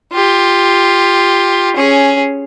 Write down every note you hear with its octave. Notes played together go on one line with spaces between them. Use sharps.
F4 G4
C#4 G#4